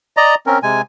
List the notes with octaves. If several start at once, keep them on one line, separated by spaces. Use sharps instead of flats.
D5 D#5 A#5
C4 C#4 A#4
C3 G#3 G#5